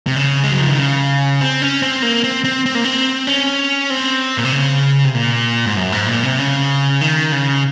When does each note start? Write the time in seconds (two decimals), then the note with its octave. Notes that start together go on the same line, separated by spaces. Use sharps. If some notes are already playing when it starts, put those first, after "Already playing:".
0.07 C3
0.16 C#3
0.43 G#3
0.51 F#3
0.60 F3
0.69 D#3
0.78 C#3
1.41 C4
1.62 C#4
1.82 C4
2.02 A#3
2.24 C4
2.44 C4
2.66 C4
2.75 A#3
2.84 C4
3.27 C#4
3.90 C4
4.38 A#2
4.45 C3
4.52 C#3
5.04 C3
5.14 A#2
5.66 G#2
5.76 F#2
5.92 G#2
6.07 A#2
6.23 C3
6.39 C#3
7.01 D#3
7.32 C#3